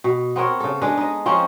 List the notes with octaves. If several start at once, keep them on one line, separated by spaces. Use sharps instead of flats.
B2
B3 C4 A#4 C#5
C#3 A4
G#3 D4 A4 B4
D#4 D#5
F3 C4 C#4 D#4